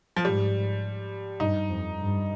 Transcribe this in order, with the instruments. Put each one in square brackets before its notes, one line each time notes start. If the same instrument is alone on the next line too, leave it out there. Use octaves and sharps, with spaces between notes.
[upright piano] F3
[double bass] G#2 [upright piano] G3
[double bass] G2 [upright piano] D#4
[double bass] F2
G2